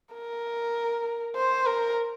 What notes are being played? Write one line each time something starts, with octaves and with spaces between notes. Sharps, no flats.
A#4
C5
A#4